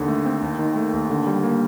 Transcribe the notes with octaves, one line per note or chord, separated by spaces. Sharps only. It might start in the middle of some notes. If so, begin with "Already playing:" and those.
Already playing: D#2 D3
A3
C4
D#2
D#3
A3
D#2
D3
G3
A#3